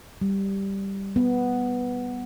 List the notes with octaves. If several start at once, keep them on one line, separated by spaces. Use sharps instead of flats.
G3
B3